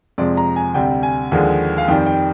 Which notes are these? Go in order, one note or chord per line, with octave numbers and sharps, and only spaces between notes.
F2 C3 F3 G#3 D5
A#5
G#5
D2 C3 G3 G5
G#5
D#2 D3 F3 G#3
F5
F2 D#3 G3 G5
G5